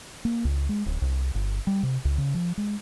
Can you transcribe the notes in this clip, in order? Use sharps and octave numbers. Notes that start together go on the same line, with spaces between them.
A#3
C#2
G#3
D1
C2
G1
G3
C3
C#2
C#3
F3
G#3